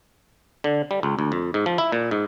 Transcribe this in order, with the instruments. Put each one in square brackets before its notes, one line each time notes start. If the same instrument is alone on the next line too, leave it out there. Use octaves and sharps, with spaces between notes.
[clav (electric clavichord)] D3
G3
C#2
D2
F2
G#2
F3
E4
A#2
G#2